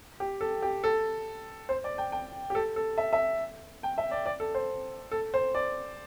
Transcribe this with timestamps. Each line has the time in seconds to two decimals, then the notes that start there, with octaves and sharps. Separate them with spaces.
0.20 G4
0.41 A4
0.63 G4
0.84 A4
1.69 C5
1.84 D5
1.98 G5
2.12 G5
2.50 G4
2.55 A4
2.76 A4
2.98 E5
3.13 E5
3.83 G5
3.98 E5
4.11 D5
4.26 D5
4.40 A4
4.55 C5
5.12 A4
5.34 C5
5.55 D5